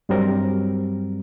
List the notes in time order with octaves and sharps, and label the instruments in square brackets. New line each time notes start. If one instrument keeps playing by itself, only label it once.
[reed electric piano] G2 F#3 G3 C4 A#4